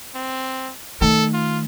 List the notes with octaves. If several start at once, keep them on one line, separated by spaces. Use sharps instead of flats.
C4
D#3 A3 A4
F4